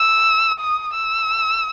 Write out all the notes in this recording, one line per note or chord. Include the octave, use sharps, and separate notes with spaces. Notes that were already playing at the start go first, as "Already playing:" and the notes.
Already playing: E6
D#6
E6